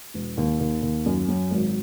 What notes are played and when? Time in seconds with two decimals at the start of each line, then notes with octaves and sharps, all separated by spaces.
0.14 E1
0.37 D#2
0.60 D#2
0.82 D#2
1.06 F#2
1.28 F#3
1.51 G#1